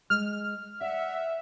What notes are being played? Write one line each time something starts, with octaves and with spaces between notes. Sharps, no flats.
G#3 F6
D5 E5 F#5